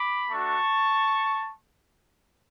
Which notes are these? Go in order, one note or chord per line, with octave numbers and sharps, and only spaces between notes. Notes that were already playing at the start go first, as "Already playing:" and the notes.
Already playing: B5 D6
A3 D4 F#4 A5 C#6